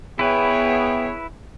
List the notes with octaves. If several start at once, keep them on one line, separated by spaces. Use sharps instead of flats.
B3 E4 G#4 B4 C#5 E5 G5